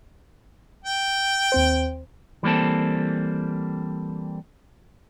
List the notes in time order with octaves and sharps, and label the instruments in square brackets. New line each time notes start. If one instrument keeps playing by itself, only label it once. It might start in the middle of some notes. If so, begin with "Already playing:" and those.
[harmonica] G5
[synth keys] D#2 C4 C5
[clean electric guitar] E3 G3 A#3 C4 A4